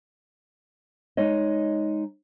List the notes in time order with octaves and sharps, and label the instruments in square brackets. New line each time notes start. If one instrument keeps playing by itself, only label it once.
[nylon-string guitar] G#3 D#4 C#5 D#5